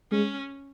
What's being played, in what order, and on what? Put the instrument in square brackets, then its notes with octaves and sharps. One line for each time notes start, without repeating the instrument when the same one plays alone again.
[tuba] G#3 [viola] C#4